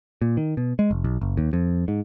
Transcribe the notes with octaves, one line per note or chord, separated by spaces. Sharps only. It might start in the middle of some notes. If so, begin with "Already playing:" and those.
A#2
D#3
B2
G#3
F1
B1
F#1
D#2
F2
G#2